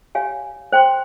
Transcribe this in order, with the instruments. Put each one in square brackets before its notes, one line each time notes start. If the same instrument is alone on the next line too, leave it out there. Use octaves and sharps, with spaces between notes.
[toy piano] G4 C#5 F5 G#5
C5 G5 C6